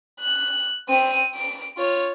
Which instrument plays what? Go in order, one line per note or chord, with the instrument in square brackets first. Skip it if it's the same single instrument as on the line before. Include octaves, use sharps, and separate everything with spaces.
[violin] F#6
C4 D#7
D7
F4 C#5